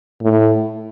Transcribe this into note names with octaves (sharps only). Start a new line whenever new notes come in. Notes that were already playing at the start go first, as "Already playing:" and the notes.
A2